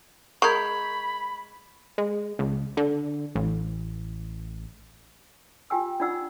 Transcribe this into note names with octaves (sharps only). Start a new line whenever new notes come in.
G#3 A#4 B5 C#6 G6 G#6
G#3
C#2
D3
A1
F4 G4 G5 G#5 E6
D4 D#4 F4 D5 F#5 E6